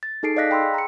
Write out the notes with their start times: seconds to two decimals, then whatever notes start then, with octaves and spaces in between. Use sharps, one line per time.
0.03 A6
0.23 D#4 G#4 A4 C7 D7
0.36 D5 D#5 F5 F#6 A#6 B6
0.51 G5 B5 C6 E6
0.62 G#4
0.74 A#5 C#7